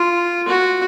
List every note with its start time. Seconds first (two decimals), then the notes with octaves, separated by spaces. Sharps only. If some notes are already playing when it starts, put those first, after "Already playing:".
Already playing: F4
0.48 F#4